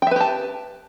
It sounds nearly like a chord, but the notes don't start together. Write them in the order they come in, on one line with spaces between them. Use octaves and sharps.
G5 E5 B4 G4 A5